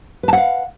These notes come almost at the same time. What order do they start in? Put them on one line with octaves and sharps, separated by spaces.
B4 A5 F#5 F5